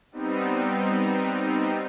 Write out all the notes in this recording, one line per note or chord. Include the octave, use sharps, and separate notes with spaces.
G3 B3 C4 D#4